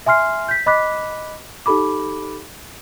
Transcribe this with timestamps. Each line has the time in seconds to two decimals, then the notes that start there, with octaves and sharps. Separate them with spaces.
0.06 E5 G#5 C6 F6 C7
0.48 G6 B6
0.66 D#5 B5 D6 F#6 B6
1.66 D#4 G4 A4 B5 D6